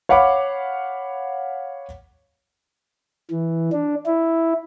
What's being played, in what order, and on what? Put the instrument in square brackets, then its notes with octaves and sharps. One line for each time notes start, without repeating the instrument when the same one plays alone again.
[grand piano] C#5 F5 F#5 B5 D6
[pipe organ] E3
D4
E4